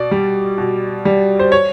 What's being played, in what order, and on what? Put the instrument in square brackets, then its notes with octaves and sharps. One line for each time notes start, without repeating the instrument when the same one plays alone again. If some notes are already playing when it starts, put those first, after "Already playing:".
Already playing: [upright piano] B2 D5
G3
B2
G3
C5
C#5